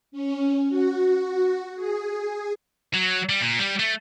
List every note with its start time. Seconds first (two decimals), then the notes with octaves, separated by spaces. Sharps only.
0.12 C#4
0.69 F#4
1.76 G#4
2.94 F#3
3.29 G3
3.41 A#2
3.59 G3
3.79 A3